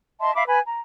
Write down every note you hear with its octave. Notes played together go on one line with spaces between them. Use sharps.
D#5 E5 A5 C6
E5 F5 B5 D6
B4 G#5 B5
A#5